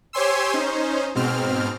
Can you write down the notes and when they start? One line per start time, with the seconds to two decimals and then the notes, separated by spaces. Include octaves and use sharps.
0.13 G4 C5 C#5 G#5 C6 E6
0.54 C#4 D#4 C5
1.15 G#2 B2 C4 F6